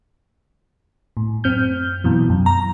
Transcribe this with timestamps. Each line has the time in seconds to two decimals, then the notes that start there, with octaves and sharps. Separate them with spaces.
1.17 A2
1.44 F#2 C4 F6 G6
2.04 F#2 B2 E3
2.30 F#2
2.46 A#5 A#6